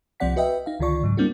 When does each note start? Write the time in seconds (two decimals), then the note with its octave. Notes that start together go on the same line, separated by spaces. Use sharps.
0.20 C2 F3 C4 D5 F#5 B6
0.36 F#4 B4 D#5 E5 G5
0.66 D#4 F5
0.79 C#2 D3 D#3 F4 D5 C#6
1.03 G#2 C#3 F#3
1.17 G3 A#3 C4 D4 E4 F#4